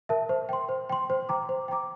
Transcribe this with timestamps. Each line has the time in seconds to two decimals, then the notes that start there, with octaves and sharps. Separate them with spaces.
0.09 A#4 E5 A5
0.29 C5
0.49 G5 C6
0.69 C5
0.89 G5 C6
1.10 C5
1.29 G5 A#5 D6
1.49 C5
1.68 G5 A#5 D6